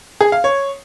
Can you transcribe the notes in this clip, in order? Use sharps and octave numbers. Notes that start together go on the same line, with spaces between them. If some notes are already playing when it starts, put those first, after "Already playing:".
G#4
F5
C#5